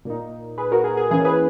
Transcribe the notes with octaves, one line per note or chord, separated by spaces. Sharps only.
A#2 A#3 D#4
G#4 B4
F#4 A#4
G#4
G#4
E3 A#3 C#4 E4 G#4
G#4 B4